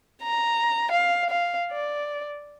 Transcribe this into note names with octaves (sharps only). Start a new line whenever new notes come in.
A#5
F5
F5
D5